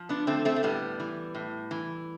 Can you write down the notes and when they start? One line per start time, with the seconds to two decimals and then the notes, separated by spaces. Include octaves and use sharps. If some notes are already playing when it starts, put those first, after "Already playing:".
Already playing: F3
0.09 B3 D4
0.27 D3 A3 C4
0.45 A3 C4
0.56 A3
0.63 A2 G3 B3
1.00 E3
1.35 A2
1.71 E3